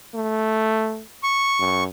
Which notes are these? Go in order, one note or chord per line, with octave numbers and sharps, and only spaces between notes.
A3
C#6
F#2